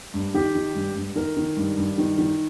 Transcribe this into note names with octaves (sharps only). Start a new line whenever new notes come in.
G2
D#3 G4
D#3
G2
G2
D#3 A#4
D#3
G2
G2
D#3
D#3